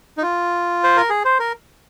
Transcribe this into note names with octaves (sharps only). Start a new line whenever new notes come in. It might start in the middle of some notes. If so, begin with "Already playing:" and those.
D#4
F4
C5
A#4
G#4
C5
A#4